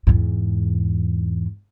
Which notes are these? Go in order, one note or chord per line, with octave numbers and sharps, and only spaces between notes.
E2 G#2